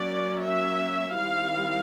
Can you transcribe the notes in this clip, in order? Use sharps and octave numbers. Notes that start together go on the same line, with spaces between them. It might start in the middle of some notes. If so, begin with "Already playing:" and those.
Already playing: F#3 A#3 C#4 D5
E5
D#3 G3 C4 E4 F5